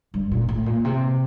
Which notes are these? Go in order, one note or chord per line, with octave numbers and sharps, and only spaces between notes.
G2
A#2
A2
A#2
C3